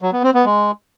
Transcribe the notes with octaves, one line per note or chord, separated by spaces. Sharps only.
F#3
B3
C4
B3
G#3